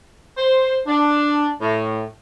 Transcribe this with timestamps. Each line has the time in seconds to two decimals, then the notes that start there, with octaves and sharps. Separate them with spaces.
0.38 C5
0.87 D4
1.62 A2